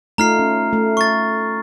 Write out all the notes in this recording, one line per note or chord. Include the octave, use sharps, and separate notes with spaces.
A3 D#4 F4 A#5 F6 C7
C#4
A3
C#6 A6